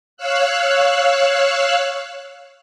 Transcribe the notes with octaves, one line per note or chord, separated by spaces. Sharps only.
C#5 F5 E6 F#6